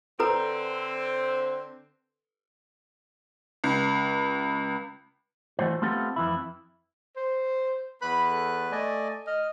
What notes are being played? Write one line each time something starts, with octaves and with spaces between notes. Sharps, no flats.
D3 C4 A4 B4 A#5
C#2
E3 A3 F#4 C5
A3 B3 C4 F4 G4 A4
F2 E3 E4
C5
E2 B4 B5 F#6
A4
A3 D5 D#5 G#5
D#5 F6